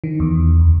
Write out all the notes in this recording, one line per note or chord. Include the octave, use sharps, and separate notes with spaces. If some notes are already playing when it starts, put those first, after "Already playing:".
D#3
E2
D2